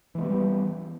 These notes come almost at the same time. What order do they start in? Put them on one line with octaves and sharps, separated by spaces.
E3 G#3 B3 G3